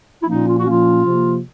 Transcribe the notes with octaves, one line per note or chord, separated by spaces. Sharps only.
E4
A#2 F3 A#3 C#4 D#4
F4
F#4
A#2 F3 A#3 C#4 F4
C3 F3 A#3